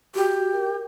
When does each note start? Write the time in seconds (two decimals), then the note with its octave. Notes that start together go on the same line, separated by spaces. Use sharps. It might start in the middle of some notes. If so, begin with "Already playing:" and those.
0.15 F#4 G4
0.53 A#4